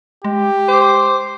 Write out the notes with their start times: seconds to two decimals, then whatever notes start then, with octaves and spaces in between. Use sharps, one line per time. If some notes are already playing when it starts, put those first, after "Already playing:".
0.25 G#3 G4
0.68 C5 D6